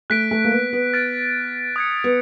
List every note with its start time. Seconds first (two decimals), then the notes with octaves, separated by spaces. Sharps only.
0.10 A3 F#6 B6 D7
0.31 A3
0.45 A#3
0.51 B3
0.73 B3
0.93 F6 A6 D7
1.76 D#6 G#6 C#7
2.04 B3